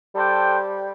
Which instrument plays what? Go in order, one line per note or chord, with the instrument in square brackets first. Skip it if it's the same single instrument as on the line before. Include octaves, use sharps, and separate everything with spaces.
[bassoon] G3 [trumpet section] D4 A4 C5 G5